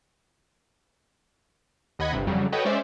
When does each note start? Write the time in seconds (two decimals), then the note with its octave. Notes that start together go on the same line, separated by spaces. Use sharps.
1.99 D#2 D#5 F#5 B5 G#6
2.12 G1 G2 C3
2.27 F2 C#3 F#3 G3
2.52 F#4 A4 B4 C#5 D#5 G5
2.65 G#3 C#4 C5 D5 E5